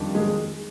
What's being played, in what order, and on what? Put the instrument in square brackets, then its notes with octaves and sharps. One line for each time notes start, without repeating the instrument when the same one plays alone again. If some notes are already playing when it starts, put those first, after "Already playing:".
Already playing: [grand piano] F2 D#3 G3 D4 G4
[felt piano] G#3